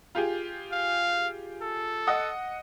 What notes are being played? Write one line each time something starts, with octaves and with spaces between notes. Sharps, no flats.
F4 G4 G#4
F5
A4
D#5 F#5 D#6